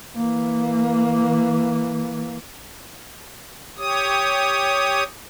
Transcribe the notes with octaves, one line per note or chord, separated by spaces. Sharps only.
E3 A#3
G4 C#5 D#6